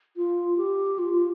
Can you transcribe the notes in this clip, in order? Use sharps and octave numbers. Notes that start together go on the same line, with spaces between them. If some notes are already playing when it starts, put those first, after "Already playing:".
F4
G4
F4